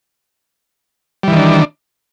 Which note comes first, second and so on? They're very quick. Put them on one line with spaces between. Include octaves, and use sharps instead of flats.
G3 E3 D#3 D4